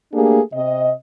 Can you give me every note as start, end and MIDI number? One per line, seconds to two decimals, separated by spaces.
0.13 0.39 57
0.13 0.39 58
0.13 0.39 62
0.13 0.39 67
0.13 0.39 68
0.52 0.90 48
0.52 0.90 75